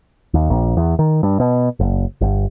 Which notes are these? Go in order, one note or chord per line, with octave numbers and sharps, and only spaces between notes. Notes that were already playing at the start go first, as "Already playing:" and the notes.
D#2
A#1
E2
D#3
G2
B2
F#1
G1